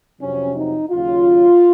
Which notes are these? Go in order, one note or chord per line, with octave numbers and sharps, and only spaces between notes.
F2 C3 F#3 C#4
D#4
D#2 C#3 F#3 F4